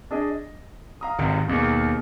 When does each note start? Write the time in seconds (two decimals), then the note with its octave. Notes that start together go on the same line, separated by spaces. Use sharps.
0.11 D4 G#4 D#5
0.31 D#5
1.01 F5 A#5 D#6
1.19 G#1 C3
1.48 D#2 B2 G#3 A#3